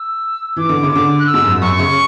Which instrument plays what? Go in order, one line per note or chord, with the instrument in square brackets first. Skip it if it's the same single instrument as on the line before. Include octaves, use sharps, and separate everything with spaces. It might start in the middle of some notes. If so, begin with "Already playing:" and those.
Already playing: [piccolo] E6
[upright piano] E3 [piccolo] D6
[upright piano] D3
C#3
[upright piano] D3 [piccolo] D6
[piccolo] F#6
E6
[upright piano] G#2
F#2
[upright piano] F#2 [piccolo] C#6
[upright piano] C#3